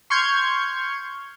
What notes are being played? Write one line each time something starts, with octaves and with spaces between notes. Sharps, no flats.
C6 C#6 F6 G6 G#6